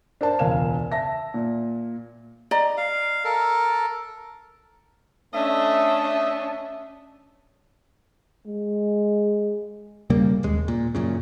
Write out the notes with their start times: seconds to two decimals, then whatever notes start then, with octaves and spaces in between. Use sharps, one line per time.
0.21 D4 A#4 C5 A5
0.39 E1 C#2 A#4 F5 G#5 E7
0.92 E5 A5 A#6
1.34 A#2
2.51 D5 D#5 A#5
2.77 F5
3.25 A4 A#4
5.33 A3 C#4 D4 D#5 E5
8.47 G#3
10.10 E1 C#3 G3 A#3
10.43 D1 D#2 G#3
10.68 A#2
10.95 F#2 A#2 C#3